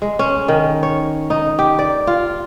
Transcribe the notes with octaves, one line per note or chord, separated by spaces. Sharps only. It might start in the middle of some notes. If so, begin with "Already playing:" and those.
G#3
C#4
D#3
C#5
D#4
G4
D5
F4